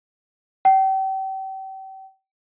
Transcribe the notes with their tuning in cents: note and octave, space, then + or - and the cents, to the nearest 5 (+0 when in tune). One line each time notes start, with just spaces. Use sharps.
G5 -35